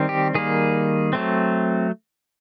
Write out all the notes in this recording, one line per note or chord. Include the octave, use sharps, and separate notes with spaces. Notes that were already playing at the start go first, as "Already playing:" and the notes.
Already playing: D#3 G3 C4
G4
D#3 G3 A#3 G#4
F#3 A3 C4